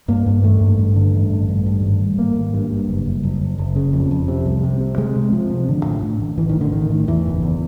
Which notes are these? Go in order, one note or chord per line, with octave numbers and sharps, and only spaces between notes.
G2 A#3
G2
A1 A3
G2
G2
D3
A1
G2
G2
G2
G#1
G#1
G#1 A#3
G#1
G2
G2
F#1
F#1
F#1
F#1
F#1
C#3
F2
F2
C3
C2
C3
C3
C3 G#3
C3
C3 F3
C3
A1 D3
A2
A2
A1
A1 E3
D#3
A1
D3
A1 D#3
A2
E2 E3
F#1
E2